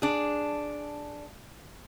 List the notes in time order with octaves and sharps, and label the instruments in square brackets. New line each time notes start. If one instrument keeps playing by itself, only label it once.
[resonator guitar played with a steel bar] D4 G#4